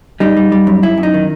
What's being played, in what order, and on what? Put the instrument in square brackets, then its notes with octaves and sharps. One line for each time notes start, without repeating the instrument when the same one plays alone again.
[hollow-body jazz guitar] G3 D#4
G3
G3
F#2
F#2 E4
F#2
D#4
D#3